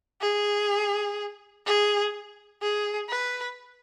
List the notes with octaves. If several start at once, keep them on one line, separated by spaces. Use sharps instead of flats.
G#4
G#4
G#4
B4